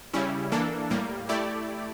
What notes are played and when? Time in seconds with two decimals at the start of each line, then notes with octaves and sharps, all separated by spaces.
0.14 C#3 G3 C#4 E4
0.52 E3 A#3 D4 A4
0.90 A2 G3 A#3
1.29 A3 E4 G4 D5